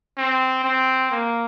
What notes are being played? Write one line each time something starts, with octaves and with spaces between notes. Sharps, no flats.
C4
C4
A#3